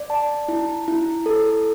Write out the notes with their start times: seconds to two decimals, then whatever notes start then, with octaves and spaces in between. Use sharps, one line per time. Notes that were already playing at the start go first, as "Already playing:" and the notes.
Already playing: D5
0.10 A5
0.48 E4
0.88 E4
1.26 A4